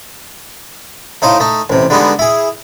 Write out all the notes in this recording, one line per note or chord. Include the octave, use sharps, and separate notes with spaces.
A2 D#4 C5 F5
A3 D#4
A1 C3
D3 G3 G#3 B3 D#4
E4 G#4